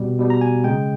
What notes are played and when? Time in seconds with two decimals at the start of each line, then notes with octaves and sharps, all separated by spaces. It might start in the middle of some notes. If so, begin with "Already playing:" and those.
Already playing: B2 G3
0.19 B2 G3
0.30 A#5
0.41 G#5
0.64 C#3 G#3 G5